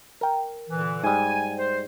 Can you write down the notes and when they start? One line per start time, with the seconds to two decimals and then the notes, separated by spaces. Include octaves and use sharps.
0.21 A#4 G5
0.70 A#2 D3 E3
1.04 G#2 G3 G#5
1.59 C5